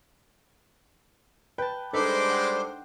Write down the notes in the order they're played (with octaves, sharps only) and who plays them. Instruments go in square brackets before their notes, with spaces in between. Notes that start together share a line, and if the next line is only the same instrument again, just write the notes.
[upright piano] B4 [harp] G5 A5
[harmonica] G3 G#3 D6 [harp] D4 D#4 B4 [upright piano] A4 [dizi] C5
[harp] F#5 G5 C6